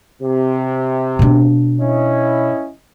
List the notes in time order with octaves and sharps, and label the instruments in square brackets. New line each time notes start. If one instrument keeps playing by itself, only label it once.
[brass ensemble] C3
[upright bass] B2 D4
[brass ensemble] C#4 E4 D#5